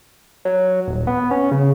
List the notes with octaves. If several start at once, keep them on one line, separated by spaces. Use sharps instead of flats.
F#3
D#1
B3
C#4
C#3